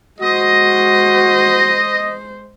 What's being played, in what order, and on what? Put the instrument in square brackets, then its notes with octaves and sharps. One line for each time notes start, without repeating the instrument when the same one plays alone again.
[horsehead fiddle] G#3 C5 [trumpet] F#4 [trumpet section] D#5